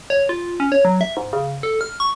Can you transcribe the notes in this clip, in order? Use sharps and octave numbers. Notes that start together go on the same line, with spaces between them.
C#5
F4
C#4
C#5
F#3
E5
G#2
C#3
A4
F6
C#6